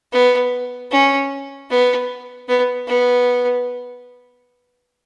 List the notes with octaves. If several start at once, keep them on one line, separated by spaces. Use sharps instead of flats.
B3
C#4
B3
B3
B3